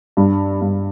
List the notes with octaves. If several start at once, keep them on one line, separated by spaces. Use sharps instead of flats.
G2
G2